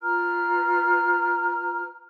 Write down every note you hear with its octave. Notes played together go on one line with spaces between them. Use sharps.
F4 B4 A#5 F6